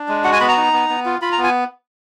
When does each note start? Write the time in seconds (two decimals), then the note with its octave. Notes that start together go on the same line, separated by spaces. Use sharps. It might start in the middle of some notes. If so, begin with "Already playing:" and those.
Already playing: D4
0.08 G#3
0.24 F#4 F#5
0.33 G#5
0.40 B3 B5
0.49 A#5
0.57 D#4
0.73 B3
0.89 B3
1.05 F4
1.22 F4 B5
1.32 A#5
1.38 B3
1.43 G#5